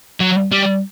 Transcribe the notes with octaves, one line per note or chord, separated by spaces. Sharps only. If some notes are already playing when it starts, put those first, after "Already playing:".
F#3
G3